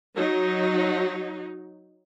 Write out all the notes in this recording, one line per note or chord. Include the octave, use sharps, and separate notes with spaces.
F#3 D#4